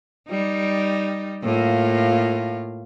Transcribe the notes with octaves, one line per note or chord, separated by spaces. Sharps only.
G3 D#4
A2 A#3 F4